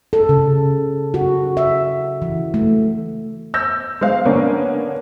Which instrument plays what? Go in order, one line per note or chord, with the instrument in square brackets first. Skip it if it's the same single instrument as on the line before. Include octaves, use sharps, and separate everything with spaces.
[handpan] A4
C#3
F#4
E5
E3
A3
[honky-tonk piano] E6 G6 A#6
G#3 C5 F5
D3 A#3 B3 C#4 D4